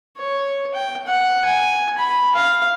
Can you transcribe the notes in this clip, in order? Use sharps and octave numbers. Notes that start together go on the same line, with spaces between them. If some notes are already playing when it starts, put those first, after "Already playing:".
C#5
G5
F#5
G#5
B5
F5